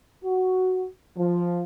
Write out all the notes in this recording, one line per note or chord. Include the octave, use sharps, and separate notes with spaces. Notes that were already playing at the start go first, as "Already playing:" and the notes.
F#4
F3